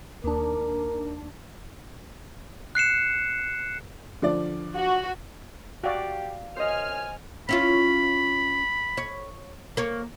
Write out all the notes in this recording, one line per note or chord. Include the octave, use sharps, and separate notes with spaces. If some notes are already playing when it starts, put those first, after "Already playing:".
D#2 D4 A#4
F#6 C7 C#7 E7
D3 F3 D5
F#4
F#4 G4 D5 F5
F#2 C5 D#5 G#5 F6
C#4 E4 F4 B5
C#5
A#3 C#5